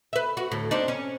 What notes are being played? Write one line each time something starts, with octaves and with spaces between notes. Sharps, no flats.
B4 E5
F#4
D2 A2
C4 D4 D#4
C#4